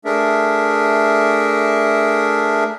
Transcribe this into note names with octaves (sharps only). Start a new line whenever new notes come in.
A3 D4 G#4 A#4 E5